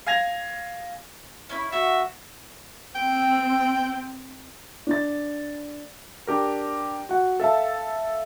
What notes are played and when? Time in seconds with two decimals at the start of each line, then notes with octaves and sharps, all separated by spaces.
0.07 F5 G#5 G#6 A#6 F7
1.49 C#4 E4 B5
1.72 F#4 E5
2.95 C4 G5
4.87 D4 A6
6.27 D4 G4 A#4
7.09 F#4 F#5
7.40 A4 E5 F5 A5